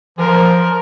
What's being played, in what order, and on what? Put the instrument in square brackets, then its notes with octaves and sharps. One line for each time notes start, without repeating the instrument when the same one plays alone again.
[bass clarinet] F3 [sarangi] A#4